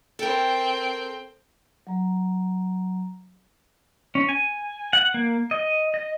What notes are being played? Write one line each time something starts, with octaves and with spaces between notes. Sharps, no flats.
C4 A4 A#4 G5
F#3 A#5
C#4
G#5
F#5
A#3
D#5
D#5